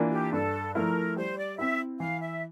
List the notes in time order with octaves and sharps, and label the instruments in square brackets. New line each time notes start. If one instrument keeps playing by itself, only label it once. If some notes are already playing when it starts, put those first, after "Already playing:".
Already playing: [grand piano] E3 A#3 D4 F4
[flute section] G4
[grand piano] G2 [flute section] A4
[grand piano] F3 A3 E4 [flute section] A#4
[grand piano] G3 [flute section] C5
[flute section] D5
[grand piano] C4 E4 [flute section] E5
[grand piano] E3 [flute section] F5
[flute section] E5